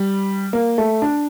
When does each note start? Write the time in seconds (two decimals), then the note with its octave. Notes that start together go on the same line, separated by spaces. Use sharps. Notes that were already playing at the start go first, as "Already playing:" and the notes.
Already playing: G3
0.53 A#3
0.78 A3
1.02 D4